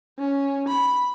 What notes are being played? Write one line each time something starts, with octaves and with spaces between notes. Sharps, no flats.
C#4
B5